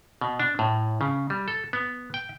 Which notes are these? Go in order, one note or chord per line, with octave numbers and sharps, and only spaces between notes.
B2
D4
A2
C#3
G3
A4
B3
G5